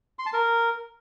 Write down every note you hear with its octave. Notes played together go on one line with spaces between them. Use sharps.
C6
A5
A#4